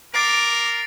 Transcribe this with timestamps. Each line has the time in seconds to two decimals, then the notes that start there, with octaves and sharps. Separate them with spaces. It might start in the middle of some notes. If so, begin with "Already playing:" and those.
0.14 A#4 D6 A6 C7 D7